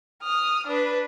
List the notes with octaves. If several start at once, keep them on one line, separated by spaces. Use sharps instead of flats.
D#6 F6
D4 B4